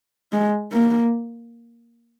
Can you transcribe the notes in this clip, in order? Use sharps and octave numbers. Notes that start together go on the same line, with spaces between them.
G#3
A#3